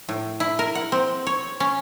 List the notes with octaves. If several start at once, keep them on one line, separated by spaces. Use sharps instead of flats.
A2
E4
A#4
F#5
C4
C#5
C#4